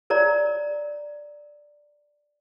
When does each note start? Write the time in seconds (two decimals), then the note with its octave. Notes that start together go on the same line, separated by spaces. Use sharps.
0.10 A#4 C#5 D5 A#5